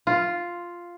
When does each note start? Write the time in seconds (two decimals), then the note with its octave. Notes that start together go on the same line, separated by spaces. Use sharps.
0.07 F4